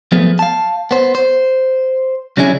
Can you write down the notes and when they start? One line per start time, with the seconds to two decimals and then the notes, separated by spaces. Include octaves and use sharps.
0.12 F3 F#3 A3 B3 G#4
0.39 F5 A5
0.91 B3 C5
1.15 C5
2.37 C#3 F#3 C#4 D4 E4 G#4